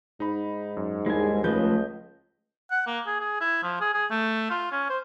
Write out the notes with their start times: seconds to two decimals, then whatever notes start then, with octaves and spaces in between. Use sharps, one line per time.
0.20 G#2 D#4 B5
0.77 F#2
1.06 D#2 G3 G#3 D4 E4 G#5
1.44 C#2 C#3 F3 A3 B4 D#5 G6
2.71 F#5
2.87 A#3
3.07 G#4
3.20 G#4
3.41 E4
3.63 F3
3.80 G#4
3.94 G#4
4.11 A3
4.50 F4
4.72 C#4
4.90 C5